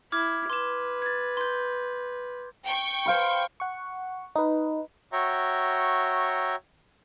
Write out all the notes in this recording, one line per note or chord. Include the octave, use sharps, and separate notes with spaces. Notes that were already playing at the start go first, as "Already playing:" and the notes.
E4 D6 F6 G#6
B4 C6 D6 E7
G#6 A6
C6 G6
G5 C#6
C5 F5 B5
F#5 C#6
D#4 B4
F#4 C#5 E5 G5 A#5 C#6